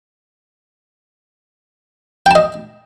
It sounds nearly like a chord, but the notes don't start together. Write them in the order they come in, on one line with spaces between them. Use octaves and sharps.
G5 A5 D#5